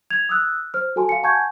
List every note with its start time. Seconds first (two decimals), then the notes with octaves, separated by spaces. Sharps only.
0.11 G#6 F7
0.29 D#6 E6 F#6
0.74 C5 F6
0.96 F#4 A4 G#5 A5 C6
1.09 F5 C#7
1.23 F#5 G#5 A5 C#6 G6 G#6